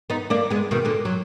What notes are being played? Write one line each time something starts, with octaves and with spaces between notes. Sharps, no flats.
B3 D#4
A#3 D4
G#3 B3
B2 D#3
A#2 D3
F#3